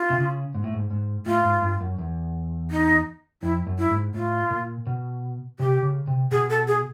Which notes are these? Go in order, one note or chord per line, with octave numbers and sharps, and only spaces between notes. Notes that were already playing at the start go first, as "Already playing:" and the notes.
Already playing: F4
C3
C#3
G#2
A2
G#2
G#2
A2 F4
G#2
G2
F#2
E2
D#4
F2 E4
F#2
E4
G#2
A2 F4
A#2
B2
C3 G4
C#3
C3
B2 G#4
A4
G#4